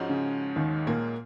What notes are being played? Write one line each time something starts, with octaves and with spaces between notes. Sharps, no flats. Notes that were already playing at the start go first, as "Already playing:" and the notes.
Already playing: G#2 F3 G#3 C#4 F#4
C#3
D#2 D#3
A#2 A#3